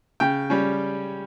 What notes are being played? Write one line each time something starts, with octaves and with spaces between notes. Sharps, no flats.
C#3 G5
G3 C#4